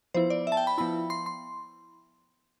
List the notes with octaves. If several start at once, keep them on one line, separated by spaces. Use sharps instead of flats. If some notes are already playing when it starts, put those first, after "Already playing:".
F3 B3 E4 C5
D5
E5
A5
G5
B5
F3 B3 E4 B5
C6
C6